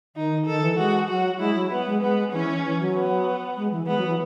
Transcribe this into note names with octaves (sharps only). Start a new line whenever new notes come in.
D#3 D#4
D#3 A4
E3
G#3 F#4
F#3 F#4
G#3 E4
F#3
B3
G#3
G#3 B3
E3 C#4
E3
F#3
B3
G#3
E3
G#3 B3
F#3
E3